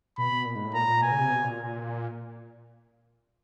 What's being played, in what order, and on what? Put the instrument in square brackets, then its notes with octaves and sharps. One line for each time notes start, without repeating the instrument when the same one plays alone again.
[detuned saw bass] B2 [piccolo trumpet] B5
[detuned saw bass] B2
A#2
G#2
A2
[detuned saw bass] A#2 [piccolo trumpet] A#5
[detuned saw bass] A#2
[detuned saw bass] B2 [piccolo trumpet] G#5
[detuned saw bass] C#3
C3
B2
A#2